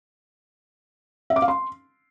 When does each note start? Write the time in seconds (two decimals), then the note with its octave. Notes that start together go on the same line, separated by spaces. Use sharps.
1.30 E5
1.36 D6
1.42 F5
1.48 C6